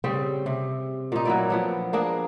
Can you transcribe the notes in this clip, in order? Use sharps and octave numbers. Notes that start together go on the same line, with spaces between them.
C#3 G3 C4
C3
A#2 D#4
F#3 A#3 E4 D5
F3 B3 D4
A#3 D4 G#4